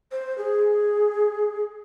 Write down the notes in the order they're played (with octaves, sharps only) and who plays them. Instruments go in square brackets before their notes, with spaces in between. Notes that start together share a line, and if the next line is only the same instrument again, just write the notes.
[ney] C5
G#4